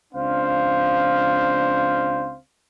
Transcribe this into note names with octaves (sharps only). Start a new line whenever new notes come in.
C#2 C4 D4 C5 F5